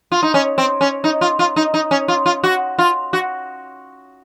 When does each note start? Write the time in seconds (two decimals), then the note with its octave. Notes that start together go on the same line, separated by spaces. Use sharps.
0.12 F4
0.23 D#4
0.34 C#4
0.58 C4
0.81 C#4
1.04 D#4
1.21 F4
1.39 F4
1.56 D#4
1.74 D#4
1.91 C#4
2.08 F4
2.26 F4
2.44 F#4
2.79 F4
3.13 F#4